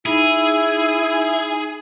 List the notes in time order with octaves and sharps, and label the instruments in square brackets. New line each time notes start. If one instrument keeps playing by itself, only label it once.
[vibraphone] D#4 B5 [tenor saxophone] E4 [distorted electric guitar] G#4